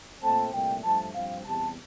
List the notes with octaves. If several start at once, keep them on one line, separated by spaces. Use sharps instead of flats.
A#2 A3 C4 A5
C2 A#2 A3 G5
G2 F3 A3 A5
G2 F3 C4 F5
E2 C3 G3 A5